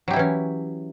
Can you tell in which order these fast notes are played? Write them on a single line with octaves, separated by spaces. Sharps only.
F#3 G4 E4 E3 C#4